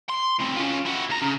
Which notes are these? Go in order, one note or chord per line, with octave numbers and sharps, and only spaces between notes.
C6
A2 C4
C#4 F4
E4 F#4
D#2 A#5
C#3